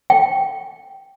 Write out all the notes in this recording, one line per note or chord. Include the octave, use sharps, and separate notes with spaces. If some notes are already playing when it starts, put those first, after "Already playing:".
G5